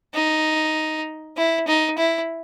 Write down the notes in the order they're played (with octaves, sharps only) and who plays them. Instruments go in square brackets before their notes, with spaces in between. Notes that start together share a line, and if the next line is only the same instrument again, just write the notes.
[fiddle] D#4
E4
D#4
E4